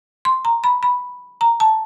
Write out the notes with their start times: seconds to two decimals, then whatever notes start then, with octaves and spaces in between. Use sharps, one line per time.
0.25 C6
0.45 A#5
0.64 B5
0.83 B5
1.41 A#5
1.60 A5